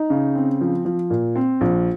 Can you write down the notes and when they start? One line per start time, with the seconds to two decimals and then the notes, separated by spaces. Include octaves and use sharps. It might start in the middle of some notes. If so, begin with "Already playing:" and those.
Already playing: D#4
0.10 C#3
0.35 C4
0.61 F3
0.85 F3
1.10 A#2
1.36 C4
1.61 A#1